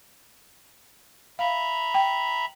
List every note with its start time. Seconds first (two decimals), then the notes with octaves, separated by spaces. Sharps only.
1.39 E5 F5 A#5 B5
1.94 G5